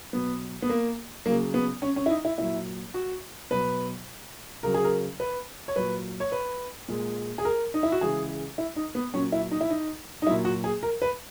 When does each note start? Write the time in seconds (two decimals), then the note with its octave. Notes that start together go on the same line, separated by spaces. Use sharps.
0.13 B2 F#3 B3
0.62 B3
0.69 A#3
1.26 C#3 F#3 A#3
1.54 B3
1.82 C#4
1.96 C#4
2.06 E4
2.10 D#4
2.25 E4
2.38 A#2 F#3 E4
2.94 F#4
3.51 B2 F#3 B4
4.63 C#3 F#3 A#4
4.74 G#4
4.84 A#4
5.20 B4
5.68 C#5
5.76 A#2 F#3 B4
6.20 C#5
6.32 B4
6.88 A#2 G#3
7.38 G#4
7.45 A#4
7.74 D#4
7.83 E4
7.92 F#4
8.01 C#3 E3 G#3 G#4
8.58 E4
8.76 D#4
8.95 B3
9.14 A#2 F#3 C#4
9.32 E4
9.51 D#4
9.61 E4
9.70 D#4
10.22 D#4
10.27 A#2 F#3 E4
10.45 F#4
10.64 G#4
10.83 A#4
11.02 B4